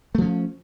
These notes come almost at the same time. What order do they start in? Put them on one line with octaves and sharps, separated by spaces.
A3 F3 C#4